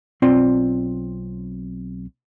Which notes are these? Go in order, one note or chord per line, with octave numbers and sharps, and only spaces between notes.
B1 C4 F4 D5 C6